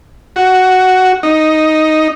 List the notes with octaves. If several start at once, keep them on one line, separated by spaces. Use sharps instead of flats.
F#4
D#4